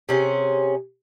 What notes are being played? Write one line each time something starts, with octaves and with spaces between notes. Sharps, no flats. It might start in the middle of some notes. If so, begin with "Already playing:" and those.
C3 C#4 G#4